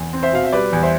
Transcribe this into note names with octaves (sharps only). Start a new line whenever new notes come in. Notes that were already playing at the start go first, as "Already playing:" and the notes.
Already playing: E2
C4
C5 E5
B2 F5
E5
G3 B4 D5
E2
C5 E5